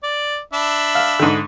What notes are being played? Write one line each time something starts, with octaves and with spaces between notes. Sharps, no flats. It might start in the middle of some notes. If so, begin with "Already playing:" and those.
D5
D4 E5 B5
F5
G#2 D3